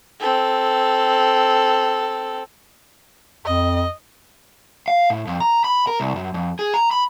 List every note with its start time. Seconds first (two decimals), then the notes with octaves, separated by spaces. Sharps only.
0.20 C4 A4
3.45 F2 D#5
4.88 F5
5.10 A2
5.27 F2
5.41 A#5
5.64 B5
5.87 A#4
6.00 C2
6.16 F#2
6.34 F2
6.59 G#4
6.74 A#5
6.91 B5